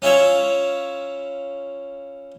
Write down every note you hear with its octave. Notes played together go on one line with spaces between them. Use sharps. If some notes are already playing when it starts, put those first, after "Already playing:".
C#4 E4 F4 C#5 E5